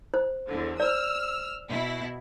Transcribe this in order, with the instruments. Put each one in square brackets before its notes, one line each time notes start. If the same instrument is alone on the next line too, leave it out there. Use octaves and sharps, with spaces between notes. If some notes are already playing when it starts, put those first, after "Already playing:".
[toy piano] C5
[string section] E2 D3
[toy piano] C5 D5 [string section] E6 F6
[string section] B2 E4